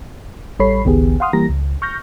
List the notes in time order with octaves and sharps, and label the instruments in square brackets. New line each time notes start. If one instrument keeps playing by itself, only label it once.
[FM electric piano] A1 G3 A4 C#5 B5 C7
G1 C#2 D#3 B3 G4 G#4
F5 F#5 C6 D#6 F6
E3 G3 A#3 G4 A#5 A#6
C#2
C#6 F6 G6 A#6